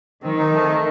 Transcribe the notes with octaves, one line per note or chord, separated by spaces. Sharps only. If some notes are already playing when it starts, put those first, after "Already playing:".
D#3 C4
D#4
D#3 A3
A3